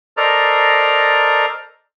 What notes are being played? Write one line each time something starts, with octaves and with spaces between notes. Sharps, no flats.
A4 A#4 C5 D5 D#5 A#5